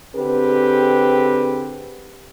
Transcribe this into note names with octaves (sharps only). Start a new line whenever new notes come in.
D3 C4 G4 G#4 B4